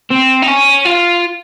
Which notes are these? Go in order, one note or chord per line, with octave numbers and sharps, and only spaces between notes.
C4
D#4
C#4
F4